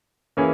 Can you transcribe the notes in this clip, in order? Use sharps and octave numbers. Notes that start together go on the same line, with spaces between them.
E3 A#3 C#4 E4 G#4